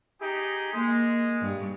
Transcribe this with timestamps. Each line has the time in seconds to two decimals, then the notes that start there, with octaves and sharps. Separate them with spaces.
0.21 D#4 G4 G#4
0.73 G#3 A#3
1.42 G2